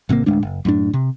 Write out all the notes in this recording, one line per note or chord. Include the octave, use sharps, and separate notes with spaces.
G#1 C3 E3 A#3
D1 A2 G#3 D4
F#1
F#2 A2 D4
C3